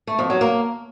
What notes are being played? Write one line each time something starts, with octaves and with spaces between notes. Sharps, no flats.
A3
F2
F#3
A#3